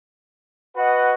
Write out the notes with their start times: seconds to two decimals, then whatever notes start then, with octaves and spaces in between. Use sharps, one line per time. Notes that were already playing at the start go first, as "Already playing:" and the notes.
0.75 F#4 B4 D#5 F#5